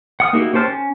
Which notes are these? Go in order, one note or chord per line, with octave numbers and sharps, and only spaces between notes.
F#5 D#6 F6
A#3 D#4 E4 F#4 G4
C#4 G4 C5 A5 F6
C#4